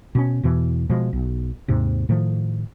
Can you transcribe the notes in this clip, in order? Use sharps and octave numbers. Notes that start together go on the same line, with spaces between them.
B2 C4 C#4
E2 B2 E3
B2 F3 G#3
B1
D#2 G#2 C3
A2 D#3 F3 A3